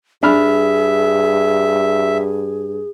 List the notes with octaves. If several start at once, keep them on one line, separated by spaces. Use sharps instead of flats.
G2 D4 G#4 E5 B5 F6